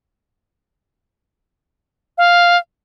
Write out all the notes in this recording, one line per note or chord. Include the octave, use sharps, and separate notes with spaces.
F5